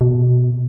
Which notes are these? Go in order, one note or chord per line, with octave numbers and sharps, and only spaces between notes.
B2